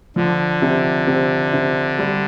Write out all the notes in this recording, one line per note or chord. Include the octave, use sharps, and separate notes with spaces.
D3 F3
C3
C3
C3
G3